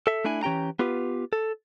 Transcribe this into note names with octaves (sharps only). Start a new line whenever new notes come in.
A4 E5
A3 D4 E4 G#5
E3 C#4 G4 G5 A#5
B3 F4 G4 B4
A4